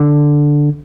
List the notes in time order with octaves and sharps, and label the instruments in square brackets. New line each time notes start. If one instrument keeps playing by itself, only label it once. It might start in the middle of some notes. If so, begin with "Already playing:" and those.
Already playing: [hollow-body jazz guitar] D3